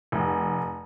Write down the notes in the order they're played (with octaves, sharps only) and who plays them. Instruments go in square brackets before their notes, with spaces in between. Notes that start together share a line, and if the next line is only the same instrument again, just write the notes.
[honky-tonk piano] F1